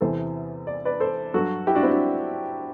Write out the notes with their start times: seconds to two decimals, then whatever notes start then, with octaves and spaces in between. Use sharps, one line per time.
0.01 E2 C3 E3 A4 C5
0.67 D5
0.85 B4 D5
1.00 A4 C5
1.34 G2 F#3 F#4 A4
1.67 E4 G4
1.75 D4 F#4
1.83 C4 E4
1.91 D4 F#4